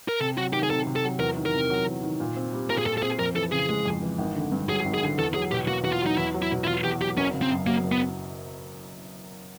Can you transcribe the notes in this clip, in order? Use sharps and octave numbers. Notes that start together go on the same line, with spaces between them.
A#4
C3 A4
F#3 F#4
D#3 G4
G#4
C3 A4
C3
A4
F#3
E2 A#4
D#3
A#4
C3
F#3
E2
D#3
A#2
C4
G3
A#2 A#4
G#4
A#2 A4
A4
C4 G#4
F2 A#4
E3 A4
C#3 G#4
G#3
F2
E3
G#1
D3
G2
F#3 G#4
G#1
G#4
D3
E2 A4
F#3 G#4
B2 G4
A#3 F#4
E2 F#4
F4
F#3 D#4
E2 E4
F#3
E4
B2
E4
E2 F4
E2 G4
F#3 G4
F#1 C#4
C#3
C4
F#2
F#3 A#3
F#1
B3